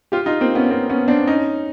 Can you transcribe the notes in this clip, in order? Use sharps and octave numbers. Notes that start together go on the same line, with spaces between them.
F4 G4
D#4 F4
A#3 C4
B3 C#4
A#3 C4
B3 C#4
C4 D4
C#4 D#4